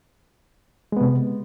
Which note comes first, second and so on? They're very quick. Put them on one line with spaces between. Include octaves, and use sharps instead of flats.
G#3 B3 C3